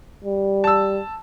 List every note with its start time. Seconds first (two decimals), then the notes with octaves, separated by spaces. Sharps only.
0.25 G3
0.64 A5 E6